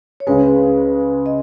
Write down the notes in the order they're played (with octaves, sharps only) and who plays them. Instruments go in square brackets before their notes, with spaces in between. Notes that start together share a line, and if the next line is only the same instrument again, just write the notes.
[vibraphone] C#5
[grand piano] C#2 C#3 G#3 [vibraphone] B4
[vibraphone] D#5